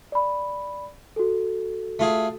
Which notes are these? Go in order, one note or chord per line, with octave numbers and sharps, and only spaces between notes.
D5 B5
F#4 A4
A3 F4 G#4